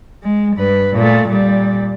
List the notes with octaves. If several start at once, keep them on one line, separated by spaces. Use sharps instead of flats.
G#3
G2 B4
A#2 A3
A#2 G3